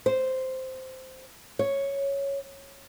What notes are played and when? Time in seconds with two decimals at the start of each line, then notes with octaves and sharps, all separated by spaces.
0.06 C5
1.59 C#5